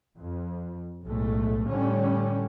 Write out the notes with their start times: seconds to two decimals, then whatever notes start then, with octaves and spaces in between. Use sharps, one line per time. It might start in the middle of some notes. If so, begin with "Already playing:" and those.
0.17 F2
1.04 B1 A2 G#3 A3
1.67 A2 D3 G3 C#4